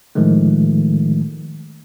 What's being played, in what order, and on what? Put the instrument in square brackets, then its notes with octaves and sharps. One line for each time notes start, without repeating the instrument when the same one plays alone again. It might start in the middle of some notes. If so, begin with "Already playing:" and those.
[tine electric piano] A2 D#3 F3 G#3 A3